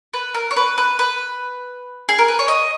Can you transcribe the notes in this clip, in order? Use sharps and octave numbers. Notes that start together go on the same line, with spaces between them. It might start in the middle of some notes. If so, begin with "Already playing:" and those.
B4
A#4
C#5
B4
B4
B4
G#4
A#4
B4
C#5
D#5